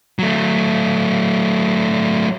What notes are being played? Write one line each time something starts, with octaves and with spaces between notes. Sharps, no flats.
F#3 A3